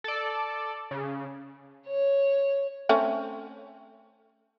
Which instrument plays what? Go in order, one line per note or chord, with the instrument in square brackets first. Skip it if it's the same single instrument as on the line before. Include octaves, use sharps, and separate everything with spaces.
[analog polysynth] A4 D5
C#3
[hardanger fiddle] C#5
[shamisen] A3 C4 C#4